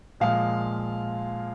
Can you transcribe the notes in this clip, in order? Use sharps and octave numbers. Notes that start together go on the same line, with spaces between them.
A#2 F3 G#3 F5